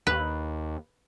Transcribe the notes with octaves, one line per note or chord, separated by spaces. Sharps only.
D#2 B4